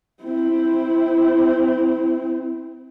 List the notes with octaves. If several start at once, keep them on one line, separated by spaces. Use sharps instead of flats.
C4 E4